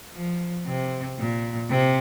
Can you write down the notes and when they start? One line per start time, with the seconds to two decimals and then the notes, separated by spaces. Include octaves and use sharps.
0.14 F3
0.66 C3
1.18 A#2
1.69 C3